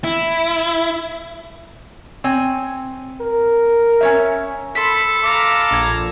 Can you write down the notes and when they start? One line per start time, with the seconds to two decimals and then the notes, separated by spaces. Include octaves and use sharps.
0.04 E4
2.24 C4 C#5 G#5
3.21 A#4
4.01 C#4 C#5 E5
4.75 A4 B5 C6 B6
5.24 F5 A#5 D6
5.71 A#1 G#6